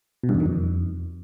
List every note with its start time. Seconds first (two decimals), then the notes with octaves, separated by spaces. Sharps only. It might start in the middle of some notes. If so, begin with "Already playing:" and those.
0.23 B2
0.29 G2
0.35 E2
0.40 D#3
0.46 F2